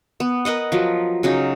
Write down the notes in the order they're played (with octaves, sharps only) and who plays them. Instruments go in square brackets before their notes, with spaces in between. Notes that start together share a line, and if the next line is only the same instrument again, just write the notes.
[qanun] B3
A#4 B4 D#5 F#5
F3 F#3
C#3 F#3 C#4 D#4